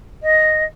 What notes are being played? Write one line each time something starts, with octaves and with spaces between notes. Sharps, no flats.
D#5